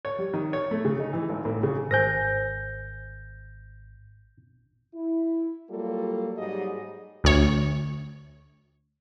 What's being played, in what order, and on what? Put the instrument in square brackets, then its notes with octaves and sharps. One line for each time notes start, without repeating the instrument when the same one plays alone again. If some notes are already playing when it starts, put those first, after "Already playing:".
[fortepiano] C#5
G3
D#3
C#5
A3
C#3
D#4
E3
G#1
A1
C#3
[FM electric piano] G#1 [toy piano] A#4 C5 G#5 [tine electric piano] G6 A#6
[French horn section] E4
F#3 G3 A#3 F4 A4
G#2 F#3 G3 G#4 D#5
[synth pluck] D2 C#5